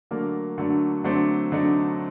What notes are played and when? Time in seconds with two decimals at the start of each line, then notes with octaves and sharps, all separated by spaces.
0.11 D3 F#3 A3 A#3 D4 A#4
0.58 D3 F#3 A3 D4
1.04 D3 F#3 A3 C4 D4 C5
1.52 D3 F#3 A3 D4 D#4 D#5